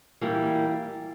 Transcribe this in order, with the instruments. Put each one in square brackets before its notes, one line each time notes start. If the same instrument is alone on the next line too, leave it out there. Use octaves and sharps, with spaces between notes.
[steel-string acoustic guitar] E3 G3 A#3